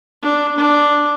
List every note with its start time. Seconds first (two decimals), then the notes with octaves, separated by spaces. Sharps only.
0.23 D4
0.58 D4